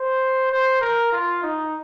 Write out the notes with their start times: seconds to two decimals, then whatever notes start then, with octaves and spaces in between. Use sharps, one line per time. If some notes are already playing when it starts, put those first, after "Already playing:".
Already playing: C5
0.51 C5
0.81 A#4
1.13 F4
1.43 D#4